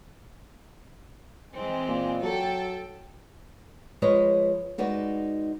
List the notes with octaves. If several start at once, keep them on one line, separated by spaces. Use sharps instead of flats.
E3 G#3 C4
A#2
F#3 A4 G5
F3 G#3 B4 C#5 D#5
G#3 D#4 F#4 B4 D5